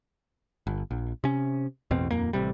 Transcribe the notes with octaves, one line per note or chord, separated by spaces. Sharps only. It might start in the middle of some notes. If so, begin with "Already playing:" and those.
G1
A#1
C3 C#4
A1 E2 B2 C4
D#1 G#1 F2 A#3
A1 C3 G3